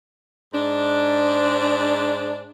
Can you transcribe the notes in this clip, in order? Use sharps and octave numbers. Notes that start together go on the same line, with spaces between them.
G#2 D4